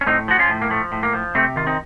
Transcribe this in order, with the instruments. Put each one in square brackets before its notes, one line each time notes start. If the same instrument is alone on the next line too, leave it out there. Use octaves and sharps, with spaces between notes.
[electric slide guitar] C#4
A2 C4 D#4
F3 F#4
C#4 F4
A2
A#3
F3 A3
A2
A#3
F3
C3 A3 C4
D#3 F4
C4 D#4